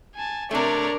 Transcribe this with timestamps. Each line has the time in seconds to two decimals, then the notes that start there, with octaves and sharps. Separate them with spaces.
0.15 G#5 A5
0.51 C3 A3 D4 A#4 C#5 D5